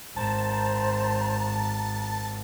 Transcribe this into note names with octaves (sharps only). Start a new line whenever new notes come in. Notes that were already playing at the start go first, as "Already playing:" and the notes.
G#1 C5 A5 A#5